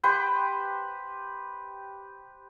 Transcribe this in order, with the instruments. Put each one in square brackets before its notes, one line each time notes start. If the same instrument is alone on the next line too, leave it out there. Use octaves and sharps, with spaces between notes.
[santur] G4 B4 C5 G5